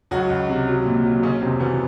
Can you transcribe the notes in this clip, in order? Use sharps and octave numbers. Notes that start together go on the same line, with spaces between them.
C#2 F#3 F#4
C#2
C3
F#3
A#2
F#3
C#3 C#4
F1 C3 C4
B2 E3 B3